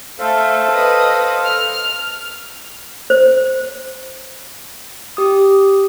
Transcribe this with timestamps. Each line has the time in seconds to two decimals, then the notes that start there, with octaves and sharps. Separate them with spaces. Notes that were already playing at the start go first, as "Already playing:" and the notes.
0.20 A3 A4 C5 F5
0.72 B4 D#5
1.44 F6
3.10 C5
5.17 G4 D#6